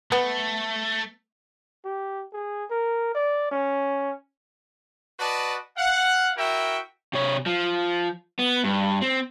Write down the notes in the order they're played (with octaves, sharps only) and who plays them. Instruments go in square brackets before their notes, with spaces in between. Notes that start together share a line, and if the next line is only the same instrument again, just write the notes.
[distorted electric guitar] A3 [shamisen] B3
[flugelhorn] G4
G#4
A#4
D5
C#4
[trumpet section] F#4 B4 D5 D#5 A5
F5 F#5
E4 F#4 A#4 E5 G5
[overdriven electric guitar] C3 C#5
F3
B3
G2
C4